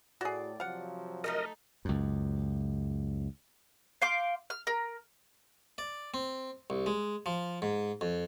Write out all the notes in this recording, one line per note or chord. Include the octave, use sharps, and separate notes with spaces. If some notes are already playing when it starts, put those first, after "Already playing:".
A2 F#4 G#4 D5
C3 F3 F#3 F5 F#5
A3 D#4 A4 A#4 D#5
C#2 F#2
F5 C6 D6 G6
F6
A#4
D5
C4
C2
G#3
F3
G#2
F2